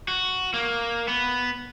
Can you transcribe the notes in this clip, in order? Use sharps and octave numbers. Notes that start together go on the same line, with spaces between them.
F#4
A#3
B3